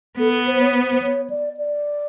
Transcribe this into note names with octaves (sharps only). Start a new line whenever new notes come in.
B3 A4
C5
C#5
C5
C#5
D5
D5